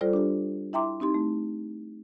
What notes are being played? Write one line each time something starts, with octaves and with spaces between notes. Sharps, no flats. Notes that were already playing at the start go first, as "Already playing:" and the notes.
G3 F4 A4 C5 D5
D4 G4
E4 E5 G5 A#5 C6 D6
C4 D#4 G4 C6
A3